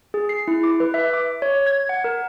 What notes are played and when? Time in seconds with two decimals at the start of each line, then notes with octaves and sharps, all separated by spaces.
0.14 G#4
0.29 C7
0.48 E4
0.63 D6
0.80 B4
0.94 E5
1.13 D6
1.42 C#5
1.66 G#6
1.89 F#5
2.04 A#4